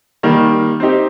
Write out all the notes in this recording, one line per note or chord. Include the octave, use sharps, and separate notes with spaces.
D#3 G3 A#3
C4 D#4 G4